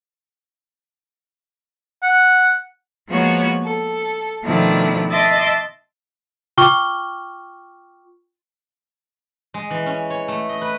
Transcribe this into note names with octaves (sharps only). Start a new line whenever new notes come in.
F#5
F3 G#3 A#3 B3 F#4 C#5
A4
B2 D#3 F3 A3 D4 E4
D#5 E5 A5 C6 D6
F4 G5 C#6 D6 F6 G7
G#3
E3
C#4
C#5
A3
D#5
B4